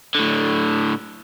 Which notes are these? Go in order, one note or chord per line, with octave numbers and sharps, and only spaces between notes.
A2 D3